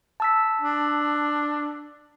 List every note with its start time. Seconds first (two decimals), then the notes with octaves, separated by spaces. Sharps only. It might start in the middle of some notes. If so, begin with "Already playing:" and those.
0.20 A5 E6 B6
0.61 D4